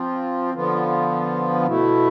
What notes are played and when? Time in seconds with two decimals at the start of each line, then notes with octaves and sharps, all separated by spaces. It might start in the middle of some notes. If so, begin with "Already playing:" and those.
Already playing: F3 C4 F4
0.54 D3 F3 B3 F4
1.65 B2 A3 E4